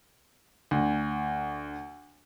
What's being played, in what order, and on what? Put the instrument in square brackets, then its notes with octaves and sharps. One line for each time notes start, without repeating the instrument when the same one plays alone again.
[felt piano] D2